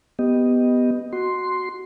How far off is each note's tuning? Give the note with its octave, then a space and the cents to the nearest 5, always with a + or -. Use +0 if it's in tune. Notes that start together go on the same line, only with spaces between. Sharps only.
B3 +0 G4 +0 D#5 +0
F#4 +0 C6 +0